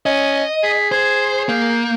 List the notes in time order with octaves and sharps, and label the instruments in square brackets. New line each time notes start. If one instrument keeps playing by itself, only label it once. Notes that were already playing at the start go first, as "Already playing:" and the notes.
[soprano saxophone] C#4 [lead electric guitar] D#5
[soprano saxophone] G#4 [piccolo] B6
[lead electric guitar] C5 [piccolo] G#6
[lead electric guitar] A#3 [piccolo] G6